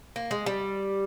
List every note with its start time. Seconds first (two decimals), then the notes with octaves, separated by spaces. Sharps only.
0.16 A#3
0.31 G#3
0.46 G3